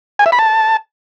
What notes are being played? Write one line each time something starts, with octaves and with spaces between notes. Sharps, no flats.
G#5
E5
B5
A5